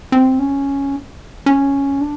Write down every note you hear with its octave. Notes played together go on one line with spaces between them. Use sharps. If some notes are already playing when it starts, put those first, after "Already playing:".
C4
C#4
C#4
D4